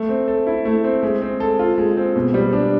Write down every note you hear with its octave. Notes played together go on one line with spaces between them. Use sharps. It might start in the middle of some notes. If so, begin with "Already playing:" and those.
Already playing: A3
C4
A4
E4
A3
C4
G#3
C4
A4
F4
G#3
C4
B2
G3
D4